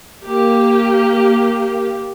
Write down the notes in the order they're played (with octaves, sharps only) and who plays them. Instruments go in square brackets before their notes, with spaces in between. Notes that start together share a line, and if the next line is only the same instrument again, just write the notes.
[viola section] A#3 G4